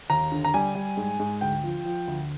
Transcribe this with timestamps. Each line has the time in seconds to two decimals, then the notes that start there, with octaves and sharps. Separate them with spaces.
0.10 D#2 A#5
0.32 D3
0.45 A#5
0.54 G3 G#5
0.75 G3
0.97 G#2
1.20 G#2
1.41 D2 G5
1.63 F3
1.85 F3
2.08 D2